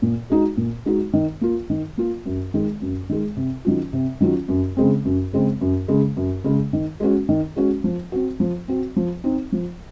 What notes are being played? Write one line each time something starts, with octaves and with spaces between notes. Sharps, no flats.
A#2
G#3 D#4 F#4
A#2
G#3 D#4 F#4
D#3
A#3 F4
D#3
A#3 F4
F#2
D#3 G#3
F#2
D#3 G#3
C3
D#3 F#3 C#4 F4
C3
D#3 F#3 C#4 F4
F#2
C#3 G#3 C4
F#2
C#3 G#3 C4
F#2
C#3 G#3
F#2
C#3 G#3
D#3
G#3 C#4 F#4
D#3
G#3 C#4 F#4
F3
C4 F#4
F3
C4 F#4
F3
C4 D#4
F3